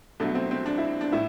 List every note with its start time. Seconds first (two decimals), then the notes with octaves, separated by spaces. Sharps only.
0.20 C2 B2 F#3 A3 D4
0.35 C4
0.51 C4
0.66 D4
0.78 E4
1.01 D4
1.12 A2 E4